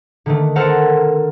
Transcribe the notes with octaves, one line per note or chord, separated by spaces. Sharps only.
D3 D#3 A3
A4 A#4 C5 F#5 A#5